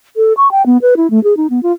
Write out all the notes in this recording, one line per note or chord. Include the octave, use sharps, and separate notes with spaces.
A4
C#6
G5
B3
B4
E4
A3
G#4
D#4
B3
F4